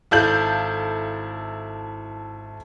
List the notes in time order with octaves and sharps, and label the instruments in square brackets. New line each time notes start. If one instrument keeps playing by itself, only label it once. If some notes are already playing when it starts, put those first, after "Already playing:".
[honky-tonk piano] G#1 E4 A4 F5 G6 F#7